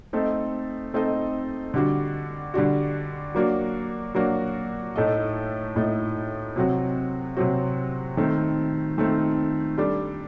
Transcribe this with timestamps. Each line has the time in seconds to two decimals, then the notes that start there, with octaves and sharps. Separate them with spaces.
0.13 A3 C4 D#4 A4 D#5
0.93 A3 C4 D#4 A4 D#5
1.74 D3 G3 D4 F#4
2.54 D3 G3 D4 F#4
3.35 F#3 A#3 D4 F#4
4.15 F#3 A#3 D4 F#4
4.96 A2 A3 D#4 A4 D#5
5.76 A2 A3 D#4 A4 D#5
6.56 C3 F#3 C4 F#4
7.37 C3 F#3 C4 F#4
8.17 D#3 A3 C4
8.98 D#3 A3 C4
9.78 G3 D4 A4